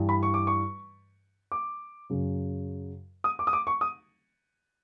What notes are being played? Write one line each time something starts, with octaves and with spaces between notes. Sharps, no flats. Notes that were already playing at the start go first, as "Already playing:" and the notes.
Already playing: G2 E3 G3
B5
C#6
D6
C#6
D6
F#2 C#3 F#3
D#6
D6
D#6
D6
C#6
D#6